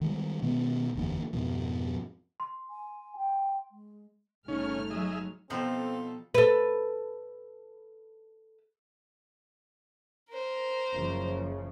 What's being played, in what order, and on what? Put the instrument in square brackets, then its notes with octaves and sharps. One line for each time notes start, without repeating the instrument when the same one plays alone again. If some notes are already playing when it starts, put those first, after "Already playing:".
[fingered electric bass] D#3 F3 G3 G#3
B2 D#3 G#3 B3
F#1 E2 D3 A#3
F2 G#2 B2 F3
[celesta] C6
[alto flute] G#5
G5
G#3
[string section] G1 A3 F6 [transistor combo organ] C#3 C#4 [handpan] D#4
[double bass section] F#3 G#3 [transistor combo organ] G#4 D#5 E5
[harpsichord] B2 [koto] F3 G3 D#4 [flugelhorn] C4 [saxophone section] F4 A4
[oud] A4 B4
[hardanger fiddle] A#4 C5
[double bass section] F#1 C#3 F3